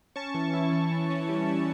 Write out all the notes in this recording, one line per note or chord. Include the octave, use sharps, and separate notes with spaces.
C#4 A5 C#6
E3
E4
E3
E3
C#4
G3
E4